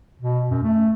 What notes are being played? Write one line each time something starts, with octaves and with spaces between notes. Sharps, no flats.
B2
F#2
A3